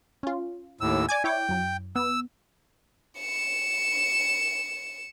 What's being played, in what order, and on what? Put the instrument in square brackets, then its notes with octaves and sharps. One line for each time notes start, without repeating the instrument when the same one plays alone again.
[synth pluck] C#4 F4
[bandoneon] D#2 A2 E6
[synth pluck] D5 D6 G#6 [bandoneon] G#5
[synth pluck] E4 C#5 D6 [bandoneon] G5
[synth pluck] F#2 F#3
[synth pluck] B3 [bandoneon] E6
[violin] C#7 E7